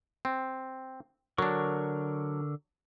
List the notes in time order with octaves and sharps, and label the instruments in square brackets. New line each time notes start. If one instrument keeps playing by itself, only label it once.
[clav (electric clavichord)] C4
[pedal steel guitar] D3 A#4 C#6 [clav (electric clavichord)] F#3 D4